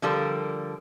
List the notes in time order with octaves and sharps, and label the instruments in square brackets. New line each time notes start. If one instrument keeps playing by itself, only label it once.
[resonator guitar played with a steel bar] D3 F3 G3 A4 A#4